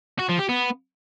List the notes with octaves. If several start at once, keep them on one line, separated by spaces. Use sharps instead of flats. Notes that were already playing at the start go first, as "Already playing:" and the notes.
F#4
F3
G4
B3